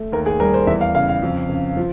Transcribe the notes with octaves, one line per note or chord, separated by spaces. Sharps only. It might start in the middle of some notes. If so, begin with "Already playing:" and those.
Already playing: A3
D#2 A#4
G#4
G3 A#4
C5
E2 E5
F5
C#3 F5
F5
F2
C#3
F3